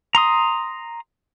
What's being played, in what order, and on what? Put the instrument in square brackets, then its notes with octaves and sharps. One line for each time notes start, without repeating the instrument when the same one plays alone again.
[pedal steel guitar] A#5 C6 D#6